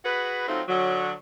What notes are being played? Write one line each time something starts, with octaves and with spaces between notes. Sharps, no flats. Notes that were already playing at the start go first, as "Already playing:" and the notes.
F#4 G#4 B4
F#3 A3 C4 D#4 F4
D3 F#3